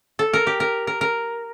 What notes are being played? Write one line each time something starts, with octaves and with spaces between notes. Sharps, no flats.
A4
A#4
G4
A#4
A#4
A#4